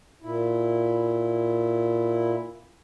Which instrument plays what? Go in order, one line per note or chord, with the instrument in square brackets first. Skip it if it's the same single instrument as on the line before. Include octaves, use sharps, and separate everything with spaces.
[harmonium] A#2 E4